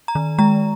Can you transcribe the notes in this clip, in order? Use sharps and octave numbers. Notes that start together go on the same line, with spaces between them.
A#5
D#3
G#3 A#5